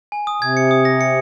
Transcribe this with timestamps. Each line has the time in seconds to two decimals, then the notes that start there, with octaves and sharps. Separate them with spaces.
0.12 G#5
0.27 D#6
0.41 C3 G#6
0.57 C#7
0.71 D#6
0.85 A#6
1.01 C#7